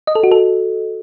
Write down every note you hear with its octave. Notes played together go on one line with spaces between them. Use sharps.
D#5
A4
F#4
A4